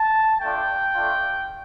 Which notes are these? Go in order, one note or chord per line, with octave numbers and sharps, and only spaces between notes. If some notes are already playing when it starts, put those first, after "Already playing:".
Already playing: A5
A3 D4 F4 G5
A3 D4 F4